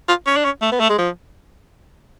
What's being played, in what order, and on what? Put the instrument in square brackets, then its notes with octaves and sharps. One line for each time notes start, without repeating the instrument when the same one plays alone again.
[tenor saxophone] F4
C#4
D4
C#4
A3
B3
A3
G#3
F3